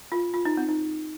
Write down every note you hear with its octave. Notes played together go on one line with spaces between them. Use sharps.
F4
F4
D#4
C4
D#4